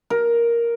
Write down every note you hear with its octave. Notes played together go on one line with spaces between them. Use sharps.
A#4